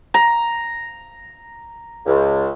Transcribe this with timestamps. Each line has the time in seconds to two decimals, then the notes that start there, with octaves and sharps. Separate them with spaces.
0.14 A#5
2.05 C#2